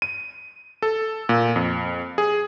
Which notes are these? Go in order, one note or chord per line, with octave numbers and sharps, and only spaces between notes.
D#7
A4
A#2
F2
G#4